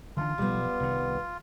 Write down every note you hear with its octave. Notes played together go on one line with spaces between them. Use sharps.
D3 E3 D4 F4
B1 F3 G3 B3
C2 D#3